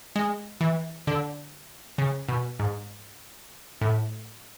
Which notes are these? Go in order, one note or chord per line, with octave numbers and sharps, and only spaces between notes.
G#3
E3
D3
C#3
B2
G#2
A2